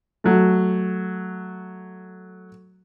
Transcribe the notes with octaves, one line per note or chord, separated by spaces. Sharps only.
F#3 A3